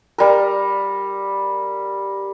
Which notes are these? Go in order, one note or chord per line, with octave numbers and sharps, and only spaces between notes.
G3 A#4